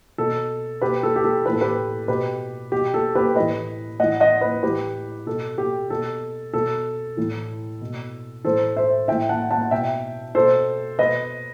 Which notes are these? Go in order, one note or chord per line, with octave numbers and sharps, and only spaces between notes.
B2 A4
B2 G4 B4
A4
G4
A4
A2 E3 A4 B4
G4 B4
B2 G4 B4
B2 G4
A4
G4 B4
A2 E3 B4 D#5
A2 E3 D#5 F#5
D#5 F#5
B4 D#5
A2 E3 G4 B4
B2 A4
G4
B2 A4
B2 A4
A2 E3
B2
A2 E3 A4 C5
C5 E5
A2 E3 E5 G5
F#5 A5
F#5 A5
B2 E5 G5
B2 A4 C5
B2 B4 D#5